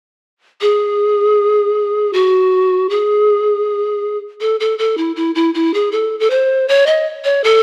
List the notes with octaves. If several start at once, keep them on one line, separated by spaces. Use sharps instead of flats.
G#4
F#4
G#4
A4
A4
A4
E4
E4
E4
E4
G#4
A4
A4
C5
C#5
D#5
C#5
A4